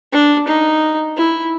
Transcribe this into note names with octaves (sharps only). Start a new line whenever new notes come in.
D4
D#4
E4